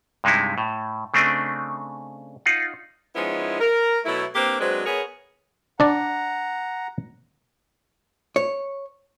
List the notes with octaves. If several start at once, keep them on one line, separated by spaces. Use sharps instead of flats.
G2 C3 G#3 D#4 E4
A2
C#3 A3 C4 D4 D#5
D#4 F4 F#5
F3 G#3 B3 C#4 D#4 E4
A#4
B2 F#3 A3 E4
A#3 C4 D4 G4 A#4 B4
F#3 G#3 C4 D4 B4 C5
B3 G#4 A#4 C#5
D4 D5 F#5 A#5
C#5